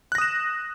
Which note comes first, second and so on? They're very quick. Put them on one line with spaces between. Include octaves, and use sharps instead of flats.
F#6 A#6 D#6 E7